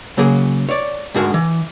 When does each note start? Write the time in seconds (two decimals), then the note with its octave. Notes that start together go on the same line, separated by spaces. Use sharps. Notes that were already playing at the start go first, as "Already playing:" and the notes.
0.17 C#3 F#3 A#3 G#4
0.69 C#5 D5
1.14 D2 G#2 D3 F#4 G#4 A#4
1.34 E3